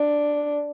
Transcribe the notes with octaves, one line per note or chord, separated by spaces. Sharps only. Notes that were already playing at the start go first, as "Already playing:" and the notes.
Already playing: D4